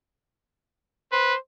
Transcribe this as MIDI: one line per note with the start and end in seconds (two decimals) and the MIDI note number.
1.12 1.34 71
1.12 1.38 72